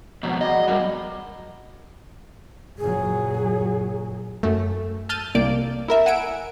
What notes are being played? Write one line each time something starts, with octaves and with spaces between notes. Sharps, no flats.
F2 B2 F#3
B2 G3 G#4 D#5
F5
G2 F#3 A#4 G#5
F#1 A#2 F#3 G#4
F#2 A3
A5 E6 F6 G6 A6 D#7
C2 A#3 D5 D7
E4 A#4 E5
F#5 G#5 E6 D7